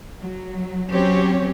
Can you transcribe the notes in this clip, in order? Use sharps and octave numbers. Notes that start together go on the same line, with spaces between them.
F#3
F#3 C4 C#4 G4 C#5